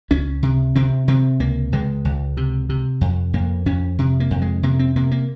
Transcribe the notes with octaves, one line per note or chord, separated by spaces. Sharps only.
C#2 C#4
C3
C3 C4
C3 C4
C#2 A#3
C#2 G#3
C#2
C3
C3
F2
F2 A#3
F2 C#4
C3
A#3
F2
G#3
C3 A#3
C4
C3 A#3
A#3